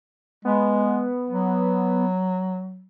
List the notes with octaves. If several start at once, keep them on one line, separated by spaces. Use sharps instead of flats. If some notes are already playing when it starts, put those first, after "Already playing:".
G#3 B3
F#3